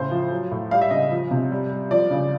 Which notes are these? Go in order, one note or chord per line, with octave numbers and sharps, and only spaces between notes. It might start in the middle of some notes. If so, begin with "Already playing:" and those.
Already playing: A2 C#3 C5
F3
F#3
A2
G3 F5
E5
C#3 D#5
F3
C3
G3
G3
F3 D5
C#3